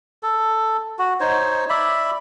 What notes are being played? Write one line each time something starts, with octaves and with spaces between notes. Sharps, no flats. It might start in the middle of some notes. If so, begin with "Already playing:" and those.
A4
F#4
D#4 C5 C#5
D5 E5 B5